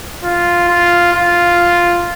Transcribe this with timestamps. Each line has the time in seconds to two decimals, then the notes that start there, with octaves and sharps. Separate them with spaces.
0.23 F4
0.69 F4
1.13 F4